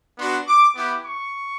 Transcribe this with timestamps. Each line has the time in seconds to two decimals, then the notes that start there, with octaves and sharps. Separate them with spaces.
0.18 B3 D4 F#4 C6
0.47 D6
0.76 B3 E4 G4 D6
1.05 C#6